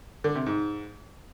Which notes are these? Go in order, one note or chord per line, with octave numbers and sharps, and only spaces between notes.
D3
C3
G#2